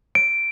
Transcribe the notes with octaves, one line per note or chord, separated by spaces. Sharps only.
D7